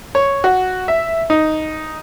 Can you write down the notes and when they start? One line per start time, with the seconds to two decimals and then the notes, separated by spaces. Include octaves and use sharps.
0.15 C#5
0.44 F#4
0.88 E5
1.30 D#4